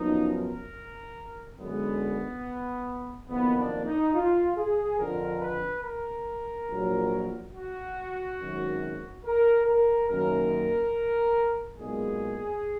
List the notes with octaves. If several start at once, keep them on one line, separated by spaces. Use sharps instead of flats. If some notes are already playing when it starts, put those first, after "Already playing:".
Already playing: F#2 F3 B3 D#4
A#4
F#2 D3 G#3 B3
F#1 F2 D#3 A#3 B3
D4
D#4
F4
G#4
F2 D3 F3 A#4
B4
A#4
A#1 A#2 F#3
F#4
G#1 F#2 D#3
A#4
A#4
F#2 D#3 A#3 A#4
B1 A#2 G#3 B3 G#4